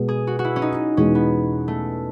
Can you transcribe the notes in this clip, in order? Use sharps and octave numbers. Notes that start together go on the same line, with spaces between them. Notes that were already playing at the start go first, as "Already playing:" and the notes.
Already playing: B2 G#3 B3
G#4
F#4
F#4
E4
C#4
D#4
E2 B2 G#3 C#4
B3
A3